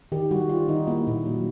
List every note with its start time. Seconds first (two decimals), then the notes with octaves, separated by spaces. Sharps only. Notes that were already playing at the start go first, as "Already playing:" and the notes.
0.12 D#3 G4
0.31 G3 F#4
0.49 D#3 F4
0.68 D#3 D#4
0.87 A#3 E4
1.07 A#2
1.26 F#3